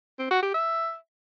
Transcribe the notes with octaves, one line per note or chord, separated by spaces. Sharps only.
C4
F#4
G4
E5